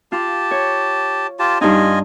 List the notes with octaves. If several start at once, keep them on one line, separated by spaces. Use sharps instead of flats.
F4 G4 A5
C#5
F4 G4 A5
G2 D#4 F4 D#5 G#5